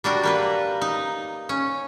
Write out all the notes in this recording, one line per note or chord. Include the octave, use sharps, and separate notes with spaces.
G3 D4 F#4 A#4
G3 A#3 B4
D#4
C#4